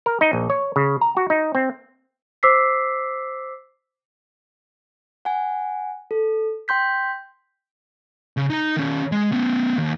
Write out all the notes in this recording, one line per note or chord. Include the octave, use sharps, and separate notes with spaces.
A#4
D#4
A#1
C#5
C#3
A#5
F#4
D#4
C4
C5 D6 E6 B6 C7
F#5 G#5
A4
G5 C6 G6 B6
C#3
D#4 A#5
D#3 C#4
G#3
B3 C#4
D#2